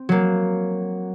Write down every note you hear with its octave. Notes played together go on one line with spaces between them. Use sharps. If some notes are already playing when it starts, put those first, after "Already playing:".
Already playing: C4
F#3 A#3